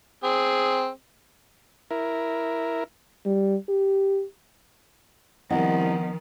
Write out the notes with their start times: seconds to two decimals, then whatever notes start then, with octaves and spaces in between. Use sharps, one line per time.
0.24 C4 G#4
1.91 E4 A#4
3.26 G3
3.69 G4
5.50 C2 D#3 F3 B3 D#5 F#5